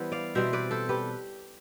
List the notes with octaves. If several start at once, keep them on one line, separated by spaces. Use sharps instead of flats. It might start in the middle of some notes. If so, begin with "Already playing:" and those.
Already playing: E3 G3 B3 C5
D5 F5
B2 G3 C4 C5 E5
B4 D5
A4 C5
G4 B4